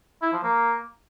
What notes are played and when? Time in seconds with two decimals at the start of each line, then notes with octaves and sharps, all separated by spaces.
0.22 E4
0.33 F3
0.43 A#3